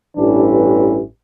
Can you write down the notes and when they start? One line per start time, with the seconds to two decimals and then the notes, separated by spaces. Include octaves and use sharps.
0.16 A1 G2 E3 D4